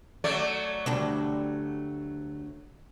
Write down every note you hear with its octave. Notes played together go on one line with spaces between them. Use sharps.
F#3 A3 D5
D2 G3 D4